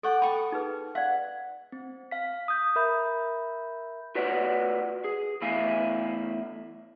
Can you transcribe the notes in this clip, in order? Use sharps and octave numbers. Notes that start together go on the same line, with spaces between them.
A4 D5 F#5 G5 C#6
G5 A5 B5 C#6 D#6
D#4 G#4 B4
D5 F5 F#5
C4
F5 B6
D#6 G6
A#4 E5 B5 G6
F4 F#4 B4 C#5 D5 F#5
G#4
E2 A2 E4 E5 F5 G#5